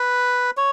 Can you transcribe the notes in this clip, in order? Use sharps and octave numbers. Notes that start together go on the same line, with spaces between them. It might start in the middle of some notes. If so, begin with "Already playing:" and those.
Already playing: B4
C#5